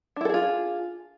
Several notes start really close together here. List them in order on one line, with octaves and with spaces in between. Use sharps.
D4 E4 A4 G#4 F4